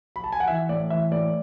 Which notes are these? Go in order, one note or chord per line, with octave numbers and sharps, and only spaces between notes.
B5
A5
G#5
F#5
E3 E5
A2 D5
E3 E5
A2 D5